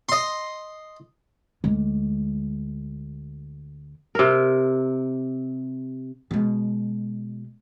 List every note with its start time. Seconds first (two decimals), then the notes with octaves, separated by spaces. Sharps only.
0.09 D#5 C6
1.64 D2 G#3
4.15 C3 A#4
6.31 B2 G#3